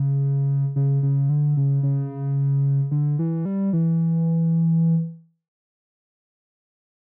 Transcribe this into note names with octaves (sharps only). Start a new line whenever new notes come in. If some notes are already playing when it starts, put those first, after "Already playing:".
Already playing: C#3
C#3
C#3
D3
C#3
C#3
D3
E3
G3
E3